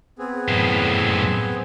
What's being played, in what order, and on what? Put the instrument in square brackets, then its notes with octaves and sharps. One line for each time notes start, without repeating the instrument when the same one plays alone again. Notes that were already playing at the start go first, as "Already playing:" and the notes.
[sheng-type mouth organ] B3 C4 G#4
[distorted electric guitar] F#2 A2